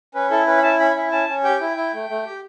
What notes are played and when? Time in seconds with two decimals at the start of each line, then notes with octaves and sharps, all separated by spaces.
0.15 C#4 B4
0.30 E4 A4
0.47 C#4 B4
0.57 B5
0.63 E4 A5
0.79 C#4 B5
0.96 E4
1.12 C#4 A5
1.28 C#4
1.44 G4 G5
1.61 E4
1.77 E4
1.93 A3
2.09 A3
2.25 G4